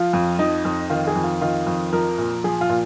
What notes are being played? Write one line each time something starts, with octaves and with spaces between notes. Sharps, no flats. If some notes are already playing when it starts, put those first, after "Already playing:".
Already playing: F3 F4
F2
F3 D#4
F2
D#3 F4
G#4
F2
F4
D#3 F4
F2
F3 A#4
A#2
F3 G#4
F4
A#2